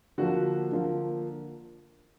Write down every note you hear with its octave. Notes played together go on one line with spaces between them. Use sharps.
D3 F3 A#3 F#4
D3 F3 A#3